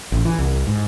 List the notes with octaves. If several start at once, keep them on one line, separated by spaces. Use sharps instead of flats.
A1
E3
C2
G#2